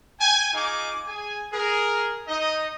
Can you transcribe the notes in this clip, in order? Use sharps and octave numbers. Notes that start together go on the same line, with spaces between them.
G5 G#5
D#4 F4 G#4 G#5 D6
G#4 G#5
G#4 A#4
D#4 D#5